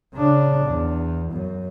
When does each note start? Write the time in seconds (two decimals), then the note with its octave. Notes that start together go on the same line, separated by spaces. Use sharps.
0.14 C#3 D4
0.66 E2
1.32 F#2